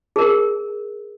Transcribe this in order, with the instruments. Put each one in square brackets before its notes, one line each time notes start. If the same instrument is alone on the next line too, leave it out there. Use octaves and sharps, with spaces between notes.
[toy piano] G#4 A#4